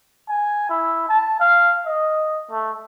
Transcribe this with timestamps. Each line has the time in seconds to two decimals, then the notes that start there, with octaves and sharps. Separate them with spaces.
0.29 G#5
0.70 E4
1.09 A5
1.40 F5
1.86 D#5
2.51 A3